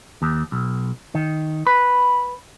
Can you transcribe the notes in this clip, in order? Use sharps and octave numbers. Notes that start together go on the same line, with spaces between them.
D#2
B1
D#3
B4